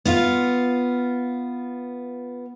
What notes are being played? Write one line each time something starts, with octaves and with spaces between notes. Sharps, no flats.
B3 F4 F5